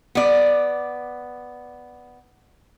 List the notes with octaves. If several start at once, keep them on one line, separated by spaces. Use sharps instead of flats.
B3 D5